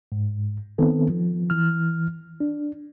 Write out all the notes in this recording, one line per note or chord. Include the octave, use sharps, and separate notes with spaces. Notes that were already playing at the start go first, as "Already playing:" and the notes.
G#2
D#3 B3 C4 A4
F3
E3 F6
D4